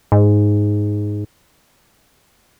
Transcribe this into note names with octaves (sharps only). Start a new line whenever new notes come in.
G#2